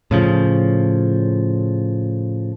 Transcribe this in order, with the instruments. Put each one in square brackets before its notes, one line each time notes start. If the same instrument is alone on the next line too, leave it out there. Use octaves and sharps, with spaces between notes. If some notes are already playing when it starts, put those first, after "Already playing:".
[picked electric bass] A2 C#3 F3